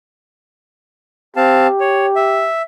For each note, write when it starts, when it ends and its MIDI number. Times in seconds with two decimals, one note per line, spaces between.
1.36 1.67 60
1.36 2.50 67
1.36 1.67 77
1.36 1.67 81
1.80 2.06 73
2.16 2.62 76